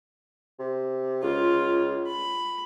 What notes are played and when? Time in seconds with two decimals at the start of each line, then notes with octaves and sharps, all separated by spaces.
0.59 C3
1.23 C#2 F4
2.07 B5